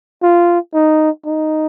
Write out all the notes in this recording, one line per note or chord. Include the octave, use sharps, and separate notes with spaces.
F4
D#4
D#4